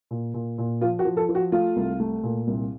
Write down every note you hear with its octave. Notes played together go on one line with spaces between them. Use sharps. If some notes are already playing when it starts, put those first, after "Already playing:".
A#2
A#2
A#2
F3 F4
F#4
F3
A4
F3
F#4
A3 F4
C2
A3
A#2
C2